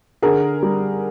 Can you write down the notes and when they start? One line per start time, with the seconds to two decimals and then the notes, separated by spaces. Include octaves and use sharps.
0.22 D3 G#4 A#4
0.62 G3